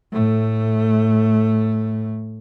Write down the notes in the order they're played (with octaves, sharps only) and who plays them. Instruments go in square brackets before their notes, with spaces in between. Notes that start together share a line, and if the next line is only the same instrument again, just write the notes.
[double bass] A2 A3